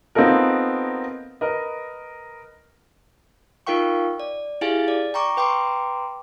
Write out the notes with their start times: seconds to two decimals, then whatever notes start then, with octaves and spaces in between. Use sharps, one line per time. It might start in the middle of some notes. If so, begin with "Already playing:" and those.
0.15 B3 C4 D#4 F4 A4 A#4
1.41 A#4 B4 D#5
3.67 D#4 F4 A#4 F5 G5 C#6
4.20 D5
4.61 E4 G4 G#4 F5 G#5 A6
4.88 D5
5.14 G5 A#5 C#6 D6
5.37 B4 G5 A#5 C6 D6